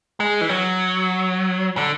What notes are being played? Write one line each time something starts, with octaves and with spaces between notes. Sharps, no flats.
G#3
E3
F#3
D3